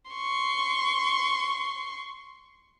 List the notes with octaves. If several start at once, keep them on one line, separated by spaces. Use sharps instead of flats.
C6 C#6